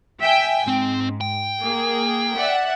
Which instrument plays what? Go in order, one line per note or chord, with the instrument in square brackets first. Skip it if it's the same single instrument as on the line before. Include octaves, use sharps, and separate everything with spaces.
[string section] E5 G5 G#5
[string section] G#2 [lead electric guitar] C4
[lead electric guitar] G5
[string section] A#3 G#4
D5 E5 F#5